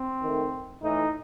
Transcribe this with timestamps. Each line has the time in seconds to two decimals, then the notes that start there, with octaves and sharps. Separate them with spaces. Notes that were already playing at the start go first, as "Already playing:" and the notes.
Already playing: C4
0.21 D#3 A3
0.82 A2 E3 A3 D#4